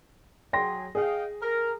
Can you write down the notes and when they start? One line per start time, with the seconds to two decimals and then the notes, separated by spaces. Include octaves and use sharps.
0.53 F#3 G#4 G5 C6 A#6
0.95 G#4 D#5 F5 G5
1.41 A#4